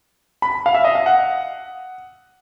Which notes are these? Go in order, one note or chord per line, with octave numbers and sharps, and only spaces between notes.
B5
F5
E5
D#5
F5
F#5